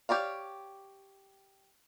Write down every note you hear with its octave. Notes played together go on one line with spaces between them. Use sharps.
G4 C#5 D5 F5